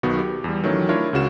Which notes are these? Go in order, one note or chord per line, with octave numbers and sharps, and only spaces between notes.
B1 D#3 B3 F#4
G4
E2 G3
D#3 E3 F#3 A3 C#4
D4 E4 F4 A#4 C#5
C#2 C#3 F#4 E7